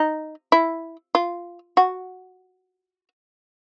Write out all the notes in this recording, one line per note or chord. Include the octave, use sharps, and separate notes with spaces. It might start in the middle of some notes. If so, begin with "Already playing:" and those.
Already playing: D#4
E4
F4
F#4